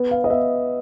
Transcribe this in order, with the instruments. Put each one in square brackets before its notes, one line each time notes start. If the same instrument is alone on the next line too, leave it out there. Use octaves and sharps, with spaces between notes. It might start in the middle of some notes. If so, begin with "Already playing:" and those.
Already playing: [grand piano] B3
F5
D#5
B3 E5